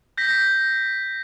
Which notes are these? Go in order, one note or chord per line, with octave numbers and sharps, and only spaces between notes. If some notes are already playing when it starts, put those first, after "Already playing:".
G6 A#6 B6